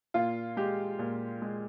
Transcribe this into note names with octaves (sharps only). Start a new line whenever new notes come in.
A#2 F4
G#3 G4
A#2
G#3